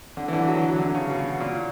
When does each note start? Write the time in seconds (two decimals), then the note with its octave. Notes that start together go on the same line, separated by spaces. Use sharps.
0.17 D3
0.28 E3
0.33 D3
0.47 F#3
0.58 E3
0.69 F#3
0.79 D3
0.95 C#3
1.10 B2
1.40 A#2